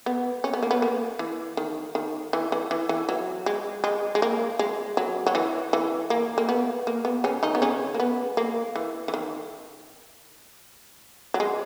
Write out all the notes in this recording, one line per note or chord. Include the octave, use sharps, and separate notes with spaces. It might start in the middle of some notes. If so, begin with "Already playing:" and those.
B3
C#4
B3
A#3
B3
A#3
E3
D#3
D#3
E3
E3
E3
E3
F#3
G#3
G#3
G#3
A#3
G#3
F#3
F#3
E3
E3
A#3
A#3
B3
A#3
B3
C#3 C#4
D#3 D#4
B3
C#3 C#4
A#3
B3
A#3
E3
E3
D#3
F#3
G#3